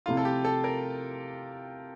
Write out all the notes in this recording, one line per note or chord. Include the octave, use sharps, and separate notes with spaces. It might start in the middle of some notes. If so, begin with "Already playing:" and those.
C3 F3 A3 E4 F4
A4
G4
A4
A#4